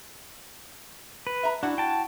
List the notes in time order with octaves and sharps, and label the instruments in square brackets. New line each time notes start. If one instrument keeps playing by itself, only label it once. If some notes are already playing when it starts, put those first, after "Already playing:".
[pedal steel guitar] B4
[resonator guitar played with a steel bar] E5 A#5
[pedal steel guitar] D4 [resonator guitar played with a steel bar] E4 F#4 F#5
[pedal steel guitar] G5 A5